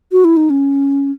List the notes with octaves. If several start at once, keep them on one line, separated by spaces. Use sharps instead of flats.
F#4
E4
D#4
C#4